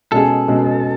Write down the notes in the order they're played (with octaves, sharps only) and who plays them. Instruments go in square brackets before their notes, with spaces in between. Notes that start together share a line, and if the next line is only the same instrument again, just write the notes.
[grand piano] B2 G#3 C#4 G#4 [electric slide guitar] A4
[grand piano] B2 G#3 C#4 G#4